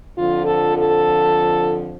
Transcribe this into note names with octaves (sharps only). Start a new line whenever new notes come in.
F2 D3 F3 F4
A4
A4